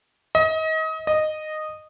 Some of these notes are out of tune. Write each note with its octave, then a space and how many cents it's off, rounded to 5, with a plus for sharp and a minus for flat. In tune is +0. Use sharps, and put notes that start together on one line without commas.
D#5 +30
D#5 -10